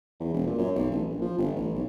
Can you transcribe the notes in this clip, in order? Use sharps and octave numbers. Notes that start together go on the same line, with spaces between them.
E2
E1
A#2
F#2
B1
A1
A#1
F3
G1
A1
B1